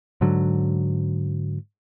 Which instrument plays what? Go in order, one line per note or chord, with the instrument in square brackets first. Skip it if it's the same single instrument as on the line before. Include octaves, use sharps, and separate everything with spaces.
[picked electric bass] G#2 D3 F#3